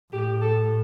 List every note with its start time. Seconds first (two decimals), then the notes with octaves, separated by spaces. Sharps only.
0.12 A2 G4
0.42 A4